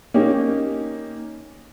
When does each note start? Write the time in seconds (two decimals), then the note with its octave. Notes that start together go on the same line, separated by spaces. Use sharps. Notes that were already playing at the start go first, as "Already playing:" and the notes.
0.14 A#3 C#4 D#4 G4